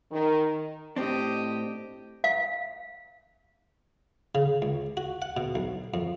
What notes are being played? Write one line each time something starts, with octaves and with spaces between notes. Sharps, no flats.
D#3
A2 C4 D4 G4 D#5
F5
C#3
C#2
F#4
F#5
B2
B1
F2